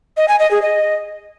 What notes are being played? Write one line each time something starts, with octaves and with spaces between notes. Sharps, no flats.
D#5
G#5
D#5
G#4
D#5